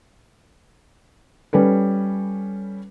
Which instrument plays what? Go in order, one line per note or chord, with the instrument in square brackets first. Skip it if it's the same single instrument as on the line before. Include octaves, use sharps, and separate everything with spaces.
[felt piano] G3 C#4 A4 B4